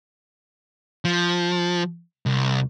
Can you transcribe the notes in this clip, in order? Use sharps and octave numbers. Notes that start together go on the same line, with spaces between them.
F3
C2